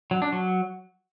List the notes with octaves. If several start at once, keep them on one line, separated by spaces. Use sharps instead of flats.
F#3
D4
F#3